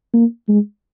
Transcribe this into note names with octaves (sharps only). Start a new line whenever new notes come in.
A#3
G#3